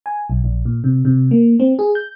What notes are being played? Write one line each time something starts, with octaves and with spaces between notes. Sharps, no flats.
G#5
B1
A#1
A#2
C3
C3
A#3
C4
G#4
G6